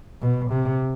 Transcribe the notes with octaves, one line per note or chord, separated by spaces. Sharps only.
B2
C3